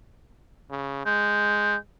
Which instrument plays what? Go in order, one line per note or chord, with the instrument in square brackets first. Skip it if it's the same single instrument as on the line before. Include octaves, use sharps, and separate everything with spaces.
[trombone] C#3
[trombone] G#3 [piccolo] G6